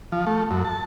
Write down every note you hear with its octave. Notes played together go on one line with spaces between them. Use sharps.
F3
A3
F#2
A5